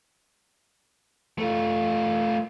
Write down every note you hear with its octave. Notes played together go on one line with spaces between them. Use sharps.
A3 F4